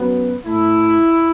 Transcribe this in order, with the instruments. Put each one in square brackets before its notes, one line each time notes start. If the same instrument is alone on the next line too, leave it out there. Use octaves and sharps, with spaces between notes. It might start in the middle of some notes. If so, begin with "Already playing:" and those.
Already playing: [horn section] F#2 F#3 B3
A2 A3 E4